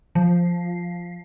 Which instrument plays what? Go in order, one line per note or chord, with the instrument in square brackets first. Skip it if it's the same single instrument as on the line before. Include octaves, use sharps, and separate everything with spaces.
[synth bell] F3